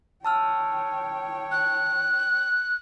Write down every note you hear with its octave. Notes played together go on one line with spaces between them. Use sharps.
C#5 G5 A5 E6 F6
F#6